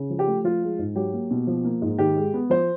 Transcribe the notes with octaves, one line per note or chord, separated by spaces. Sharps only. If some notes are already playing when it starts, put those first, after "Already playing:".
Already playing: C#3
F3
G4
A3
F3 F4
G#3
G#2
F#3 G4
A#3
B2
F3
A#3
G#2
D#3 G4
G#3
B3
F3 C5